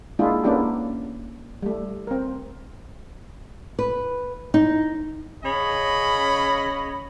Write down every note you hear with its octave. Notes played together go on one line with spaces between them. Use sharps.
G#3 A#3 D4 E4 F4 G#4
A#3 B3 C#4 D4 E4 G4
G3 A3
C4 A#4
B4
D#4
C#3 C#4 C#5 D#5 B5